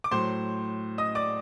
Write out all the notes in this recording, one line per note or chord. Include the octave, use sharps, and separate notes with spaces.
D6
A2 F#3 C5 C6
D#5 D#6
D5 D6